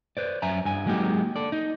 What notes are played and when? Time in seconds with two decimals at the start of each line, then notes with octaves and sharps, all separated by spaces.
0.17 B4 C5 D5
0.42 F#2 E5 G#5 A#5
0.65 G2 G#5
0.86 F#3 G#3 A#3 D#4 F#4 G4
1.36 A4 D5
1.52 D#4